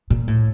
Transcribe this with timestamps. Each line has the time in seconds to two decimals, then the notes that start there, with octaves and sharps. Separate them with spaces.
0.10 A#2
0.28 A2